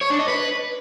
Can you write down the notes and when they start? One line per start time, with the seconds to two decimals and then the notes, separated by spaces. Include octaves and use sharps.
0.01 C#5
0.10 D4
0.19 D#5
0.28 B4